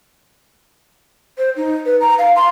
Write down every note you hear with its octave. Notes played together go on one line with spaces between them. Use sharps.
C5
D#4
B4
A#5
F5
C6